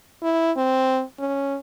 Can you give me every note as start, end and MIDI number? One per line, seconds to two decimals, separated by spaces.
0.23 0.52 64
0.57 1.03 60
1.19 1.58 61